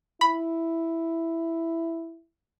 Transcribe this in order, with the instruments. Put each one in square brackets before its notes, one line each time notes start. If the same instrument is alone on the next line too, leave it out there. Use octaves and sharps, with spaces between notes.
[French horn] E4 [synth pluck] B5